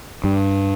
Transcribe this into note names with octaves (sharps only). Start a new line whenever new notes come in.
G2